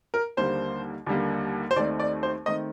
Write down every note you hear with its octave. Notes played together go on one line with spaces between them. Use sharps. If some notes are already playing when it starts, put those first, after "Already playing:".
A#4
D#2 D3 G3 A#3 C5
D#2 D3 G3 A#3
C5
D#2 D#3 A3 C4 D5
D5
C5
D#3 A3 C4 D#5